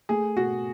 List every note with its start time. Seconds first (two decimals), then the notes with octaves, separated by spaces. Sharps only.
0.09 A3 G#4
0.36 B2 F#4